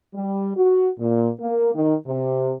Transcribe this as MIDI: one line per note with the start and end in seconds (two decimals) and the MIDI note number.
0.14 0.51 55
0.56 0.90 66
0.99 1.29 46
1.40 1.70 58
1.75 1.96 51
2.06 2.54 48